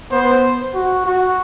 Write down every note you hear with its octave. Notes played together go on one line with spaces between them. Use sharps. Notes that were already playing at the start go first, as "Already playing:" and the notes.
B3 C5
F#4
F#4